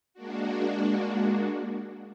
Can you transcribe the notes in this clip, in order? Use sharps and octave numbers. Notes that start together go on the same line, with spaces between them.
G#3 A#3 D4 F#4